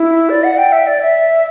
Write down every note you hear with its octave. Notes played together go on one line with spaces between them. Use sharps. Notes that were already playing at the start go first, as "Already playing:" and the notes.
Already playing: E4
D5
F#5
G5
E5
D5
E5